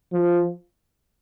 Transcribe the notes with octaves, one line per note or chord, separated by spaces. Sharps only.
F3